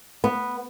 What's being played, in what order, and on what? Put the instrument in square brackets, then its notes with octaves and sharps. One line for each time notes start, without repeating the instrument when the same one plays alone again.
[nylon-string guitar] B3